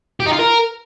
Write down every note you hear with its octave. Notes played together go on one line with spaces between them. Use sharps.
G4
D#4
F4
A#4